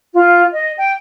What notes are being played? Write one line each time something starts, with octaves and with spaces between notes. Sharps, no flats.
F4
D#5
G5